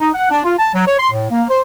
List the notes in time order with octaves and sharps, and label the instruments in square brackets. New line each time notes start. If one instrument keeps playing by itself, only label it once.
[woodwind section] D#4
F#5
D4
F4
A5
F#3
C#5
C6
A2
A#3
C5